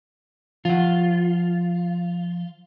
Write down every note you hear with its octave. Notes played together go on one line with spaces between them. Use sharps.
F3 F4 F#5